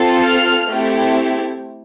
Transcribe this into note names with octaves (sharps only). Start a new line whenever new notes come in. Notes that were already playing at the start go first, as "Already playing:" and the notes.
Already playing: C4 F4 A4
F6
A3 C4 E4 G4